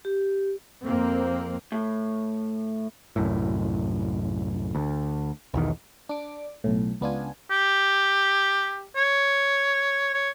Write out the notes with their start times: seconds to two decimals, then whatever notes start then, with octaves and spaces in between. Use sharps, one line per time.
0.05 G4
0.84 F2 A#3 C4
1.72 A2
3.16 C2 F#2 A2
4.75 D2
5.54 B1 E2 D#3
6.09 D4 D6
6.64 B1 A2
7.01 C#2 B3 D4 F4 G#5
7.51 G4
8.96 C#5
10.14 C#5